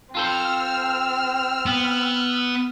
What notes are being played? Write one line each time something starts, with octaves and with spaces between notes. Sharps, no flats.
C4 F4 A4 C5 E6 F6
B3